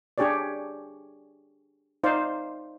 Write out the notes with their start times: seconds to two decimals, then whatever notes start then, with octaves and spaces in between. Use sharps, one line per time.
0.18 D4 G4 G#4 C#5 D5
2.04 D#4 C5 D5 F5